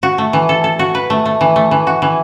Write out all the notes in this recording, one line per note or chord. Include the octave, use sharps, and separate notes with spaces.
F#4
A3
E3
A4
A4
F#4
B4
A3
A3
E3
A3
E3
F#4
E3